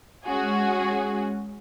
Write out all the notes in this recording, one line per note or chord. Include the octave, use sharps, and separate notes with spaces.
G#3 C#4 F#4 G#4